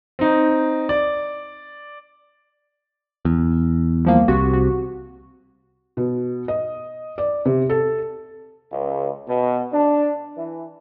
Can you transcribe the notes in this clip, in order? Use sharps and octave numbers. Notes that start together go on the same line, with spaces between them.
C4 D#4
D5
E2
C2 F3 A#3
C2 C3 F#4
F#4
B2
D#5
D5
C3
A4
C#2
B2
D4
E3